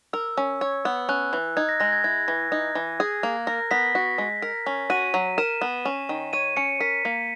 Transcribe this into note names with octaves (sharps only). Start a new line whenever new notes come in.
A#4 E6
C#4
C#5
B3
C#4 F#6
E3
D#4 G#6
A#6
G#3 A#6
G#6
E4 G#6
E3
D#4
E3
G#4
A#3
A#4 A#6
B3 B6
F#4
G#3
A#4
C#4
F#4 D#7
F#3
A#4 E7
B3
C#4
D#3
C#5 D#7
C#4 C#7
A#4 B6
A#3